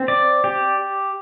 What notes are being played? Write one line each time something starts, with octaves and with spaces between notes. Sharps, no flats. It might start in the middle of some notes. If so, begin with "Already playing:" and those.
Already playing: C4
D5
G4